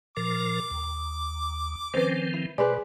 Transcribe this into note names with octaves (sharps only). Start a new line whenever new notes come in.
A#2 F3 A#4 D6
D#2
D#3 F3 C4 C#4 B4 C5
E4
B2 G#4 B4 C5 D5 G#5